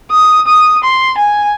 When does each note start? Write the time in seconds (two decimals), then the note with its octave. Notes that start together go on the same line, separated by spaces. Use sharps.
0.11 D#6
0.47 D#6
0.84 C6
1.18 G#5